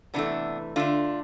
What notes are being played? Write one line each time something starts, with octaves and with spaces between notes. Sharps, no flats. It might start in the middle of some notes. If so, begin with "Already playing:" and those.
C3 E3 A3 B3 D4
D3 A3 D4 F4